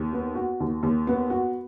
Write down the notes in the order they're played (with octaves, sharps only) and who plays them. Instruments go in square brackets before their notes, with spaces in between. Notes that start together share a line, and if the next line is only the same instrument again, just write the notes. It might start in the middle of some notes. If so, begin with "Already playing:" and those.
Already playing: [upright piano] D#2
B3
F#4
D#2
D#2
B3
F#4